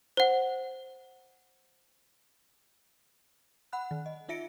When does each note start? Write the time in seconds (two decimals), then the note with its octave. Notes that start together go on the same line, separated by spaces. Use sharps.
0.17 C5 F#5
3.73 F#5 B5 F#6
3.91 D#3
4.06 D#5
4.29 D#4 F4 E5 A#6 C#7 D7